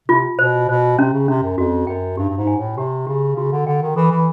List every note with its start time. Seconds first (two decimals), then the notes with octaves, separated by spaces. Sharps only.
0.08 C3 F4
0.39 B2 C5
0.69 B2 C5
0.98 C3 C#4
1.13 C#3
1.28 C3 C#4
1.43 F#2
1.58 F2 F#4
1.87 F#2 G5
2.17 G2 G4
2.29 G2
2.38 G#2
2.47 G#5
2.57 A2
2.77 C3 G4
3.07 C#3 G4
3.36 C#3 F#4
3.52 D3
3.67 D3 G5
3.82 D#3
3.96 E3 A4
4.11 E3